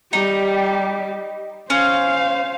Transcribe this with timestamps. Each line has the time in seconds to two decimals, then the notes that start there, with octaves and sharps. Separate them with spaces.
0.13 G3 D#4 G4
1.70 C#4 C5 F5